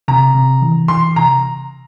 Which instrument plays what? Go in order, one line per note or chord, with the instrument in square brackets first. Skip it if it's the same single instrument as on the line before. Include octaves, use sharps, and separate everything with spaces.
[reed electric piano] C3 [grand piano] A#5
[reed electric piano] C3
E3
[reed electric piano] E3 [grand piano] C6
[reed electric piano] C3 [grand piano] A#5